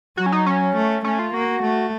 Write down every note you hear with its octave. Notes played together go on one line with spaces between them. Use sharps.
F#3 F#4
C#4
D#4
C#4
A3
A3 C#4
F4
A#3 F#4
A3